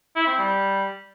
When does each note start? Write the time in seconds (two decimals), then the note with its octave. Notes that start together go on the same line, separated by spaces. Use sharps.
0.16 E4
0.27 C4
0.38 G3